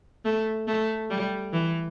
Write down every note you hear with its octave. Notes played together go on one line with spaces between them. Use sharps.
A3
A3
G3
E3